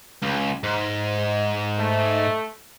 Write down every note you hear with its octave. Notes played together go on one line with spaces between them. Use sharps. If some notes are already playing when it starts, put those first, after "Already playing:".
C#2
G#2
A3